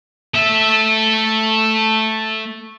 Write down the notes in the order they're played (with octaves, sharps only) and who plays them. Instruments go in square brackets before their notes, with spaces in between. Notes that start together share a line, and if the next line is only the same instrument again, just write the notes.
[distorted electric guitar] A3 E5